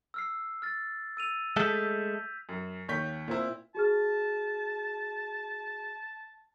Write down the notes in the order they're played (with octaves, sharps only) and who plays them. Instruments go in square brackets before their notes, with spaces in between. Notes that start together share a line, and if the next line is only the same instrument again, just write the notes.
[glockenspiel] E6 F6 C7
F6 A6
E6 D#7 F7
[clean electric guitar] G#3 A3 A4 [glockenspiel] G6 B6
[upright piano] F#2
D#2 C#5 G6 B6
A#2 C4 E4
[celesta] F#4 G#4 F6 [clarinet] A5